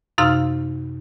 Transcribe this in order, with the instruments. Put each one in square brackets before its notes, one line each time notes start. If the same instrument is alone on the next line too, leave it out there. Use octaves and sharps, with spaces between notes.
[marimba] F#2 C3 D#4 F5 C6 F6